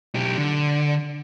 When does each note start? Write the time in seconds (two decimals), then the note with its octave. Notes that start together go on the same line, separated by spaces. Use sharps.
0.15 B1 G4
0.37 D3